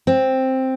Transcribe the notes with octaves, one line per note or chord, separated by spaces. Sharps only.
C4